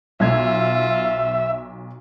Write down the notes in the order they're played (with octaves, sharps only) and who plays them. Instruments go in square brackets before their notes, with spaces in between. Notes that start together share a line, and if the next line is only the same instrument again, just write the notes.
[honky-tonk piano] B1 G#6 [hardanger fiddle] F4 [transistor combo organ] E5